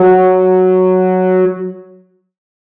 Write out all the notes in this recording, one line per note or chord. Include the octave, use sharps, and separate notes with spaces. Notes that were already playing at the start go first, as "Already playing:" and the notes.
Already playing: F#3